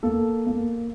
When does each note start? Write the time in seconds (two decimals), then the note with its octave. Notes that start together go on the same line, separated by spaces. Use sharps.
0.03 A#3 A4
0.46 A#3